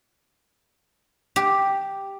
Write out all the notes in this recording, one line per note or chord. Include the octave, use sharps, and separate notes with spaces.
G4